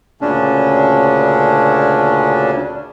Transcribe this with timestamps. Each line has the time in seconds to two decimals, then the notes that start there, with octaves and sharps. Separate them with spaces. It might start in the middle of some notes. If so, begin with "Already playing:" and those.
0.21 D2 A#2 C#3 C#4 D4